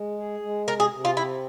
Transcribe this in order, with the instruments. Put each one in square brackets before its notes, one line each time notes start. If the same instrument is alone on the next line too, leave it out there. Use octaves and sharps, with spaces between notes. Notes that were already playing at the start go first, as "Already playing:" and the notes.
Already playing: [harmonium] G#3
G#4
G#3
[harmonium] C3 [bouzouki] A#4
[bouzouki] G#4
[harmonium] C3
[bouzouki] F4
[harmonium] C4 [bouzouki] E4